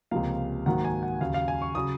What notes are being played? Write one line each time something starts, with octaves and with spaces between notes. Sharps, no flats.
C#2 C3 F3 A#3 F5
G#2 D#3 F#3 A#3 F#5
G#5
F#5
D#2 C#3 F#3 F5
F5
G#5
C#6
C#3 F#3 D#6